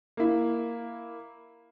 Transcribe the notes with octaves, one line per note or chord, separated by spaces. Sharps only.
A#3 E4